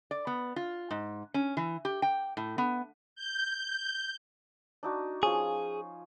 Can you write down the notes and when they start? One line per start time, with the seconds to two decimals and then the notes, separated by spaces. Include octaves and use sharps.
0.11 D5
0.27 B3
0.56 F4
0.91 G#2
1.34 C#4
1.57 E3
1.85 G4
2.02 G5
2.37 A2
2.58 B3
3.16 G6
4.83 D4 D#4 F#4
5.23 F3 C#4 G#4